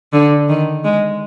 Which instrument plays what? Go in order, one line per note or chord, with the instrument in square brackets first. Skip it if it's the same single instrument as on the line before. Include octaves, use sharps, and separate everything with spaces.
[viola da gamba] D3
D#3
G#3